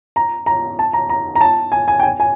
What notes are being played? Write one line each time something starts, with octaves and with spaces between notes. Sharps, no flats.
A#5
A#5
A5
A#5
A#5
A#5
A5
G#5
G#5
G5
G#5
G#5